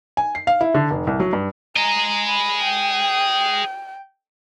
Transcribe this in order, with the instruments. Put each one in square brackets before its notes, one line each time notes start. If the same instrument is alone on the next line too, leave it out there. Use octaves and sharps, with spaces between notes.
[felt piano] G#5
C7
F5
E4
D3
F1
C2
F#3
G2
[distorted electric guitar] G#4 D#5 [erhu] A#5
[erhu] B5
G5